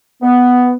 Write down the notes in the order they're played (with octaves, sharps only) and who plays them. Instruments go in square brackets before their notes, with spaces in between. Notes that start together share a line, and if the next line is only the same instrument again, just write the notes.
[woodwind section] B3